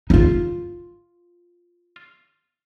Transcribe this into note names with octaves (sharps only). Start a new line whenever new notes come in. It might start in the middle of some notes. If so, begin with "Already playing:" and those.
D#4 F4